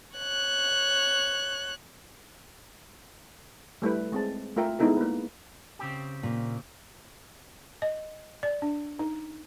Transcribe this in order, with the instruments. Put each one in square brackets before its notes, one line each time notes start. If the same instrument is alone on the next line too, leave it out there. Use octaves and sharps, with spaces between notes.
[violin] C#5 F#6
[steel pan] G3 A3 E4 B4
G#3 C4 A5
A3 F4 A#4 E5 G5
G#3 B3 D#4 E4 A4 A#4
A#3 B4
[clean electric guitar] C#3 C4 G4
[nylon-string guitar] A#2
[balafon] D#5
D5
D4
D#4